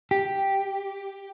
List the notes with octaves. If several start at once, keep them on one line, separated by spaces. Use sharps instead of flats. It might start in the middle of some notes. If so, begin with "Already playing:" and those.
G4